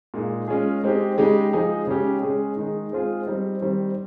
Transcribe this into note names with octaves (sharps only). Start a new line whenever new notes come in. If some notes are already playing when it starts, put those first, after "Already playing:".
A#2 G#3 D#4
G#3 C#4 F4 G#4
G#3 C4 D#4 G4
C#3 G#3 D#4 G4
F3 G#3 D#4 G#4
C#3 G#3 C#4 G4
G#3 C#4 G#4
D#3 G#3 D#4
G#3 C4 F4 G#4
G3 C4 D#4
D#3 G3 C4